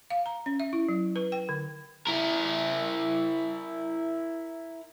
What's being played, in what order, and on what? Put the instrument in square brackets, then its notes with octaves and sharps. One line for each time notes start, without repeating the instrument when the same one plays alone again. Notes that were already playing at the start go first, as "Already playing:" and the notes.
[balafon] F5
A#5
C#4
E5
E4
F#3
B4
G5
D3
[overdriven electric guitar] E4 A#4